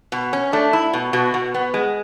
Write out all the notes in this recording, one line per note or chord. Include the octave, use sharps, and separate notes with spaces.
B2
C#4
A3 D4
E4
B2
B2 F#4
B2
B3
G#3